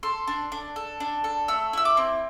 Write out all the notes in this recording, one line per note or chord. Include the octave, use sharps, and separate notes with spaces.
A4 C6
D4
D4
A4
D4
A4
A3 E6
E4 E6
D6
C4